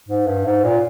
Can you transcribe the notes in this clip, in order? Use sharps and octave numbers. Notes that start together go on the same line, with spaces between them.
G#2
G2
G#2
A#2